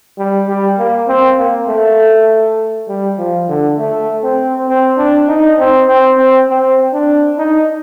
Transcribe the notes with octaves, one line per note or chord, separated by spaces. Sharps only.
G3
G3
A#3
C4
A#3
A3
G3
F3
D3
A3
C4
C4
D4
D#4
C4
C4
C4
C4
D4
D#4